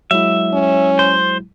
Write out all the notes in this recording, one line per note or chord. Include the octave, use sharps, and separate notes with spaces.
F#3 G#3 E4 E5
C#4
C5